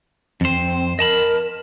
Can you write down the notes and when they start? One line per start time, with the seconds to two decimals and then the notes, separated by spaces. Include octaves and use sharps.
0.41 F2 C4 C5
0.99 A#4 D#5 A5 B5